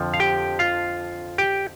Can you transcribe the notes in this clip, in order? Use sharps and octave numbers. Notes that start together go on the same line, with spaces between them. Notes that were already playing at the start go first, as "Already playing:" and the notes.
Already playing: F2 D3 F3
F5
G4 G5
F4 F5
G4 G5